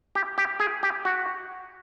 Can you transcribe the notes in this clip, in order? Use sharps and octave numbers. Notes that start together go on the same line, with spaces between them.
G4
G4
G#4
G4
F#4